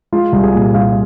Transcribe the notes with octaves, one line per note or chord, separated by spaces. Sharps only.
G#3 F4
C2
G#4
A#2
C2 F5